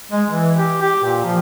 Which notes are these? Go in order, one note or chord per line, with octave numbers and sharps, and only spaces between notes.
G#3
E3
G4
G4
A#2
F3